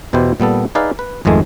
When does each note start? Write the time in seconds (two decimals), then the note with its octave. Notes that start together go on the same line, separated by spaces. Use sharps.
0.13 E2 B2 E4 G4 C5
0.40 A#2 G3 B3 A4
0.75 D#4 G#4 B4 D5 E5 F5
0.99 B4
1.25 G#1 F2 D#3 G#3 A3 G#5